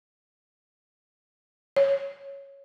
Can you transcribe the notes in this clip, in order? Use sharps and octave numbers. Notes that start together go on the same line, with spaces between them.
C#5